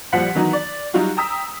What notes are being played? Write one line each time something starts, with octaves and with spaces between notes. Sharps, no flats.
A#1 F3 G3 F#5 F#6 B6
D#3 E3 F#3 B3 D#4
D5
F#3 G3 D#4 F4 F#4
G5 A#5 D#6 E6 B6